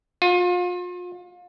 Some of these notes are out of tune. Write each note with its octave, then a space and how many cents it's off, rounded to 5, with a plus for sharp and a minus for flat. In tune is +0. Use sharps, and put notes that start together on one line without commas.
F4 +35